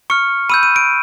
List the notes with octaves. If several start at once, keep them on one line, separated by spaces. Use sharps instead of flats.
C#6 F6 C#7
B5 E6 G6 D#7
D#7
D7